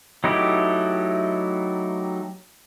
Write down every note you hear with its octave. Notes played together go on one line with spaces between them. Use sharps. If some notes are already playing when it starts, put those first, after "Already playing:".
F#3 A3 D#4 E4 G4